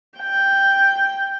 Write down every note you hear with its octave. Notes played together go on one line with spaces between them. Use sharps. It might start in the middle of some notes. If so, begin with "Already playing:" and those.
G5